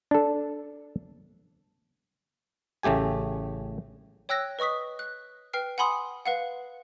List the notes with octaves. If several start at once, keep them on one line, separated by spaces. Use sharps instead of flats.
D4 A4
A1 C#3 A3 G4 G#5
C#5 G5 E6 F#6 A#6
B4 D#5 C#6 D#6 B6
F#6
B4 G5 F6 C7
F#5 G#5 B5 C6 D#6
B4 F5 F#5